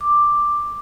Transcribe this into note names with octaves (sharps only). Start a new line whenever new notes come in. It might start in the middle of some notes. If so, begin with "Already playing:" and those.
D6